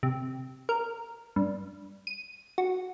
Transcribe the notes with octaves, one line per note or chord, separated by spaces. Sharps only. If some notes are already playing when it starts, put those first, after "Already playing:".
C3
A#4
G2
D#7
F#4